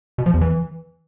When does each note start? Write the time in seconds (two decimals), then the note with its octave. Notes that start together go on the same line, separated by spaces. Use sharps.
0.18 B2
0.26 F3
0.34 E2
0.41 E3